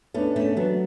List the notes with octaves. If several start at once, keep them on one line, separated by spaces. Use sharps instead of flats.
A3 B3 C#4 D4
A3 C#4
F#3 B3 D4